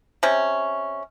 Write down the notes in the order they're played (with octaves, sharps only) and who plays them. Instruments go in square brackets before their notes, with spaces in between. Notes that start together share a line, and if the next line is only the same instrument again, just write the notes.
[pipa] C3 C#4